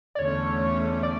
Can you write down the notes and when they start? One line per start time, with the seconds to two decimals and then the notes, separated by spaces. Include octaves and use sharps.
0.15 D5
0.19 E2 D3 A3 C#4 C#5
1.03 D5